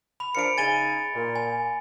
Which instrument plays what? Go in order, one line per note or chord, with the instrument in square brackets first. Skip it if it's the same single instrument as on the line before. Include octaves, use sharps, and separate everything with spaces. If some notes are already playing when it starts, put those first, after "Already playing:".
[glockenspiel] B5 F7
[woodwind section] F3 D4 A#4 [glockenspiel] C#7 D7
[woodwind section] C#3 D#4 G#5 [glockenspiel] A6 D#7 G7
[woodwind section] A#2
[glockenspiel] G#5